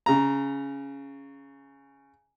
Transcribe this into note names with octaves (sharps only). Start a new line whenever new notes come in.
C#3 A#5